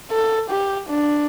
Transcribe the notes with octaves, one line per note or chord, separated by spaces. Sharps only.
A4
G4
D4